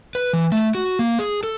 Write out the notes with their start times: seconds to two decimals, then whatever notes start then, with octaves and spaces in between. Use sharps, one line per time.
0.15 B4
0.33 E3
0.52 A3
0.75 F#4
0.99 A#3
1.19 G#4
1.43 A4